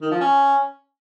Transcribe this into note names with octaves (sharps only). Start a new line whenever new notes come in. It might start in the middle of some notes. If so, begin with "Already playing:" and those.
D#3
F3
C#4